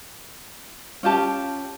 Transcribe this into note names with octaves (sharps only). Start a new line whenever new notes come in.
C#4 F4 G4 A5